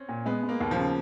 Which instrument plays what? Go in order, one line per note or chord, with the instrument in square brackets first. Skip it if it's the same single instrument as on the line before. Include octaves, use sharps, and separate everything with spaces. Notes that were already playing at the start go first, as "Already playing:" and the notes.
Already playing: [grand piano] C4 C#4
[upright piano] A#2
[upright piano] G#3 [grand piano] B3
[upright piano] G#3
[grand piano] A#3
[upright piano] D#2
[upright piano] C#3 [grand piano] F3